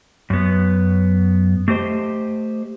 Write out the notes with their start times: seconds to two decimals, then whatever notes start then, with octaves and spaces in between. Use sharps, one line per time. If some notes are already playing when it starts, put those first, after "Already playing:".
0.30 F#2 B3
1.68 A3 G4 C5 D#5